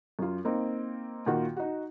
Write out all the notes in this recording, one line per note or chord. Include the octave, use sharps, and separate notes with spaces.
F#2 F4
A#3 C4 D#4
A#2 D#3 F4 F#4
D#4 F#4